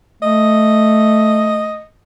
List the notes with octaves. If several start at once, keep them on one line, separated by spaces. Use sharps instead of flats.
A3 D#5